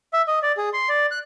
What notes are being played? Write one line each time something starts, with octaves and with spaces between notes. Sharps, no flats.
E5
D#5
D5
G#4
C6
D5
F#6